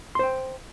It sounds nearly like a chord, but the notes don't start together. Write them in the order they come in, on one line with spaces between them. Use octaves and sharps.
C6 C5 G5